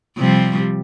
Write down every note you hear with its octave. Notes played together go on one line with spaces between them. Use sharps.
C3 F3 G3